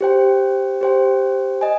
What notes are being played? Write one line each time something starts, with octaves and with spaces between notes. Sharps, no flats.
G4 C5 G5
G4 C5 G5
D#5 G#5